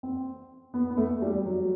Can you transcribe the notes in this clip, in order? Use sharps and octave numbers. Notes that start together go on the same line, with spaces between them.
C4
B3
B3
A3
G3
F#3